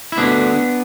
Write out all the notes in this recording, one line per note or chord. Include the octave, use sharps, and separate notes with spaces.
E4
D2 D3 B3 D4